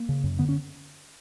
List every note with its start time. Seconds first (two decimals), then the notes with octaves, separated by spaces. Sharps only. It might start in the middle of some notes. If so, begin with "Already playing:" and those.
Already playing: A#3
0.09 C#3
0.24 F#2
0.39 D3 B3
0.49 C#4